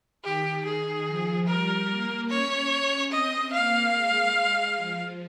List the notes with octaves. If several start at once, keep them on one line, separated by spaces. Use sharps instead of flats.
D#3 G4
G#4
F3
G3 A#4
A#3
C#4 C#5
C4 D#5
A#3 F5
G#3
F3